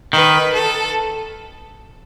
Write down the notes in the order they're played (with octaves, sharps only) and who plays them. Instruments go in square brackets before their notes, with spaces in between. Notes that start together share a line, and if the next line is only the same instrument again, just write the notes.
[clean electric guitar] D#3 [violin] B4
[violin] A4